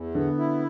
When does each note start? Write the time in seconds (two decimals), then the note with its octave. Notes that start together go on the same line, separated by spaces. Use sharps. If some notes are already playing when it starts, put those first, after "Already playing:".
Already playing: E2
0.14 D3 B3
0.37 E4